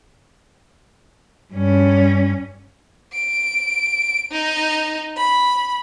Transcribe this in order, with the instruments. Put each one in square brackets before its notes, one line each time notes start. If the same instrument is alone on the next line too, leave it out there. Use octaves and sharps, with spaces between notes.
[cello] G2 C#4
[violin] D7
D#4
B5